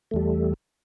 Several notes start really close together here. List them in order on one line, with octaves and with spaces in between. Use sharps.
A3 E2 G3